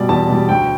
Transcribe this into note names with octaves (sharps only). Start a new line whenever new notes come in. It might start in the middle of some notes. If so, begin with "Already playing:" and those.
Already playing: B2 G3 D5
E2 A5
B2 G3
D2 G5